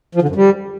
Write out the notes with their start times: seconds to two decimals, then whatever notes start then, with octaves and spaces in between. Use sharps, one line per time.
0.15 F3
0.22 D3
0.29 F#2
0.36 G3